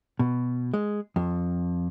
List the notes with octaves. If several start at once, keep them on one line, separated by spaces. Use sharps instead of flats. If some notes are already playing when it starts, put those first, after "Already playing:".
B2
G#3
F2